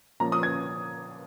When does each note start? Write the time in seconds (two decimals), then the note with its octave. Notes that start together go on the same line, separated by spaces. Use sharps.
0.20 A#2 F3 A#3 C#4 A#5
0.32 D#6
0.43 G#6